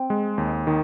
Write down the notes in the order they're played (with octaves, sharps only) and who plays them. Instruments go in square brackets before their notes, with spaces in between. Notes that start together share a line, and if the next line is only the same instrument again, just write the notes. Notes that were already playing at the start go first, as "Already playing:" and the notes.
Already playing: [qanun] C4
[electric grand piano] G#3
D#2
D#3